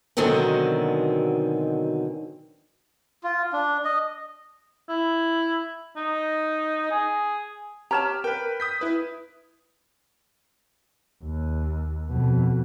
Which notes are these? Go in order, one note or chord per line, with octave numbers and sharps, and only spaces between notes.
B2 D3 D#3 F#3 G#3 C4
F4
D4
D#5
E4
D#4
G#4
G4 C#5 A5 A#5 F6 E7
A#4 B4 G5
D#6 G6 B6
E4 B4
D#2
F2 B2